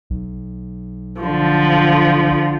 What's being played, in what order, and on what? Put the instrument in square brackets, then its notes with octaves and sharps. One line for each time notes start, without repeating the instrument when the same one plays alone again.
[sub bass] B1
[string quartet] D3 F3